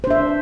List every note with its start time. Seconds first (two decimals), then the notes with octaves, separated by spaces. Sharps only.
0.04 C5
0.07 D4
0.10 E5